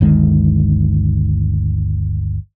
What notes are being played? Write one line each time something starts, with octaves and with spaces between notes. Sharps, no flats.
G1 D2 D#3 G#3